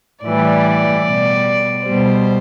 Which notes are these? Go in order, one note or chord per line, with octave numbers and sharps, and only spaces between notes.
A2 E3 G3 D5
B2 G3
B2 G3 C5